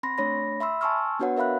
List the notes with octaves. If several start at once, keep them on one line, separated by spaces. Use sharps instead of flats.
C4 B5 C6 A#6
A3 D4 C#5 B5 A#6
E5 B5 C6 E6
G#5 A5 C6 C#6 E6 F6
B3 D4 F#4 B4 C#5 F#5
A#4 E5 F5 B5 F#6